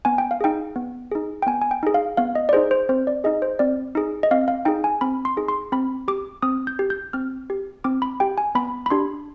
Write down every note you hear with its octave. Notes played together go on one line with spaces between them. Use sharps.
B3 G#5
G5
F5
D#4 G#4 G5
B3
D#4 G#4
G5
B3 G#5
G#5
G5
D#4 G#4
F5
B3 F5
D#5
D5
D#4 G#4 C5
C5
C4 C5
D5
D#4 G#4 D#5
C5
C4 D5
D#4 G#4
D#5
C4 F5
F5
D#4 G#4 G5
G#5
C4 B5
C6
D#4 G#4
C6
C4 B5
G4 D6
C4 D#6
G6
G4
G6
C4 F6
G4
C4 D6
B5
G4 G5
G#5
B3 B5
B5
D4 G4 C6